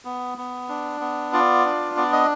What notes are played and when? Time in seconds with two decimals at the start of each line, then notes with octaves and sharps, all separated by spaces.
0.05 B3
0.38 B3
0.69 D4
1.01 B3
1.33 F4 D5
1.65 D4
1.97 B3 D5
2.12 D#5